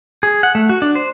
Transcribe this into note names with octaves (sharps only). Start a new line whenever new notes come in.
G#4
F#5
A3
F#4
D4
C5